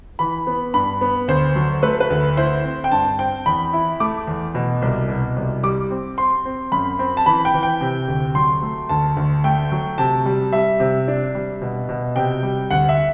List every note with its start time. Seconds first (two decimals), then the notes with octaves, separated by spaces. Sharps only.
0.19 E3 B5
0.47 B3
0.74 G2 B5
1.01 B3
1.28 D2 C5
1.55 F#3
1.82 A3 B4
2.00 B4
2.10 D2
2.37 E4 C5
2.64 C4
2.84 G5
2.91 G2 A5
3.19 C4 G5
3.46 E2 B5
3.73 E4
4.00 A3 D6
4.27 E2
4.55 B2
4.82 C2
5.09 B2
5.36 C2
5.63 G3 D6
5.90 C4
6.18 C4 C6
6.45 C4
6.72 F#2 B5
6.99 C4
7.17 A5
7.26 E3 B5
7.45 G5
7.54 E3
7.63 G5
7.81 C3
8.08 D2
8.35 F#3 C6
8.62 A3
8.89 D2 A5
9.17 D2
9.44 A3 G5
9.72 F#3
9.98 C3 A5
10.26 G3
10.53 G3 E5
10.80 C3
11.08 D4
11.35 G3
11.62 B2
11.89 B2
12.16 C3 G5
12.43 G3
12.70 D2 F#5
12.89 E5